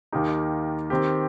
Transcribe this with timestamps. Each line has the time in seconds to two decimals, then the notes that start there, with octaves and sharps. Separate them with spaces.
0.12 D#2 D#3 A#3 D#4 G4
0.90 D#3 C4 G4